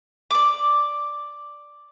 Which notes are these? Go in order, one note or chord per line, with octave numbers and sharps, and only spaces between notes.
D5 D6